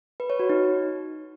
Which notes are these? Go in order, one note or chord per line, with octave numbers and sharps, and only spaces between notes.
B4
C#5
F#4
D#4